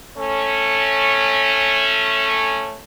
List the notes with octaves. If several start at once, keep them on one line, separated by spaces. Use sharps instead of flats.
A3 C#4